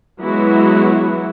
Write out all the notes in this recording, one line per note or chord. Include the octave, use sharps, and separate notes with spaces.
E3 F#3 G#3 B3 E4 F#4